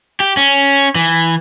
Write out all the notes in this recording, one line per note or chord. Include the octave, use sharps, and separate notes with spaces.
G4
C#4
E3